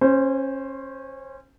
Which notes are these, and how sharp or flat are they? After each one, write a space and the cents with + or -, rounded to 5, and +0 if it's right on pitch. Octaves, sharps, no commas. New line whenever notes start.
C#4 -25 C5 +0